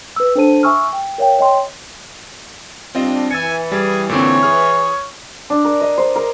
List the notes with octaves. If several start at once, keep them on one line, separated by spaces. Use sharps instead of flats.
B4 E6
D4 A4 C5 A5 D#7
E5 G#5 C#6 E6 F6
G5
A#4 C#5 F5 G5
C#5 D#5 G5 C6
G3 C4 D4 F4 D#5
E3 G#5 E6 A6 C#7
G3 G#4
A#2 D3 C4 C#5
G#4 F6
D4
A#4
D#5
C5
A#4